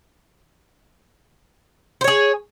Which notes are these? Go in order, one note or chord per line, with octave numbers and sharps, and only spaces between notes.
G#4 C5 C#5